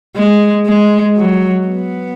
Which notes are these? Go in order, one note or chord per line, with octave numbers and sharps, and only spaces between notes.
G#3
G#3
F#3
B3